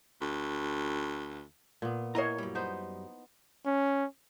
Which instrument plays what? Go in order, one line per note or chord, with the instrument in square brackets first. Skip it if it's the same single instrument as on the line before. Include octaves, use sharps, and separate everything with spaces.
[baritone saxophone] D2
[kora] A#2 B3
[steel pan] E4 C#5 [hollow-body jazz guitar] A#4 D#5 A#5
[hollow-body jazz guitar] F#2 G3
[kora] B3 D#4 C5
[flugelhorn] C#4